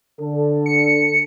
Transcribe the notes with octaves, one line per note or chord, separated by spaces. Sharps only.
D3 A4
C#7